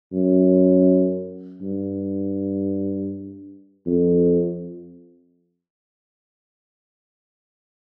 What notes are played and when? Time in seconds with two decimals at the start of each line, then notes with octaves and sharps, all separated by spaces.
0.12 F#2
1.62 G2
3.87 F2